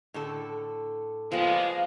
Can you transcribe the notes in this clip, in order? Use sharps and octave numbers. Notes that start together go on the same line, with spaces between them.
A2 D3 A4
F3 G3 G#3 B3 F5